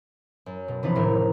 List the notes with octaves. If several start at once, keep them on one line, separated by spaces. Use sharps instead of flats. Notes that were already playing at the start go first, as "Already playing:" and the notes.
F#2
B2
C3 E3 F3 D4 D#4 B4
F#1 D#2 A2 A#4 F5 E6